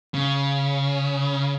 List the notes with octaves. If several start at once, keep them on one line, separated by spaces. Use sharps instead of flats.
C#3